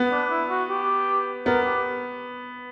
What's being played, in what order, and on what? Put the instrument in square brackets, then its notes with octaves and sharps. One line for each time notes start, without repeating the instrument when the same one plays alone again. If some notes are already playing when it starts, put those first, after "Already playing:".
Already playing: [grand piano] B3
[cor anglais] D4
E4
F#4
G4
[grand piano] B3 [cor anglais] A#4
[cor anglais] G4